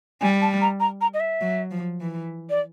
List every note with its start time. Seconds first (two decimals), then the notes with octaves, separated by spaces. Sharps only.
0.21 G3 G#5
0.42 A5
0.61 A#5
0.80 A#5
1.01 A#5
1.14 D#5
1.20 E5
1.41 F#3
1.71 F3
2.00 E3
2.50 D5